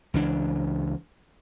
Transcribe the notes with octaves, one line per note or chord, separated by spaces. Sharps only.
C#2 E3 D4